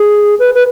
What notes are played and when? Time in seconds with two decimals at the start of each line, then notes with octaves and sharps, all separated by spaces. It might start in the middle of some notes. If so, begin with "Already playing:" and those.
Already playing: G#4
0.39 B4
0.55 B4